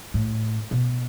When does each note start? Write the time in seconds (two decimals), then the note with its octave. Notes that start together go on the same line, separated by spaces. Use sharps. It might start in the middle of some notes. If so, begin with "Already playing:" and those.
0.14 A2
0.71 B2